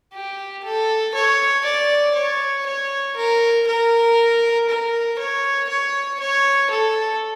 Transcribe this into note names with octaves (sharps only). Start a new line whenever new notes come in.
G4
A4
C#5
D5
C#5
C#5
A#4
A#4
A#4
C#5
C#5
C#5
A4